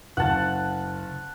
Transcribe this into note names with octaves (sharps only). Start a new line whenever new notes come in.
F#1 F#5 A5